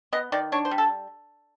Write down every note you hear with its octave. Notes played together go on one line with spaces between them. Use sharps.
B3 D#5
D#3 D5
D4 C#5
C5
G3
A4